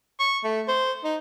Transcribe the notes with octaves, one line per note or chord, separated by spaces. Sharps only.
C#6
A3
C5
D#4